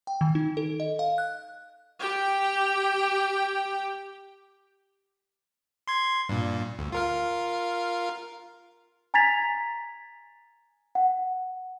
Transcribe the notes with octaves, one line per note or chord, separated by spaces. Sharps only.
G5
D#3
D#4
A4
D#5
F5
F#6
G4 G5
C6 G#6
G2 A#2
D2
F4 A#4 F5
G#5 A#5 G#6 A6 B6 F7
F#5